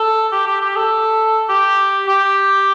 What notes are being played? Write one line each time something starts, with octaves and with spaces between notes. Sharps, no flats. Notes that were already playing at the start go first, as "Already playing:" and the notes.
Already playing: A4
G4
G4
G4
A4
G4
G4